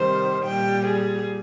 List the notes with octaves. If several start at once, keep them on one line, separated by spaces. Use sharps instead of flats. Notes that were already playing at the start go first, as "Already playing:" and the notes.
Already playing: C3 D#3 G3 C5
A#2 G3 G5
G#4